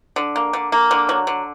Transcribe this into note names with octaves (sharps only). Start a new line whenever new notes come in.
D3
A#3
D3
A#3
D3
F#3
D3